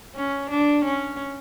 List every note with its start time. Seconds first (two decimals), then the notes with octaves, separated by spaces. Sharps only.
0.16 C#4
0.50 D4
0.84 C#4